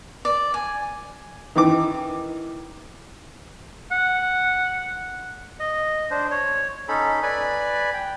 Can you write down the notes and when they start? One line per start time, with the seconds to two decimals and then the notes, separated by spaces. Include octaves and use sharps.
0.25 D5
0.54 G#5
1.56 D#3 E3 D6
3.92 F#5
5.60 D#5
6.11 D4 C5
6.31 C#5
6.88 C#4 D#4 A4 B5
7.23 B4 D5 G#5 B5
7.93 G5